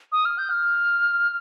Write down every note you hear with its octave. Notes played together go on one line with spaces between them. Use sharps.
D#6
F6
G6
F6